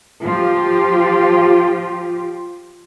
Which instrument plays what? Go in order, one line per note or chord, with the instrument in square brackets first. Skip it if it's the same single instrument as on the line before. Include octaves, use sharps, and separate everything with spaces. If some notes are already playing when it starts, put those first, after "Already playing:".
[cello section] F3 F4 G4